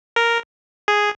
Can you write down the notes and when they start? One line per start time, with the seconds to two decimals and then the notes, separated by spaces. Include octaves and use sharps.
0.16 A#4
0.88 G#4